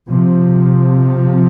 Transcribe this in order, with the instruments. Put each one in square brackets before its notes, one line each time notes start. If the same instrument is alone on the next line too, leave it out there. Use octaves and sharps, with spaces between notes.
[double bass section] C3 F3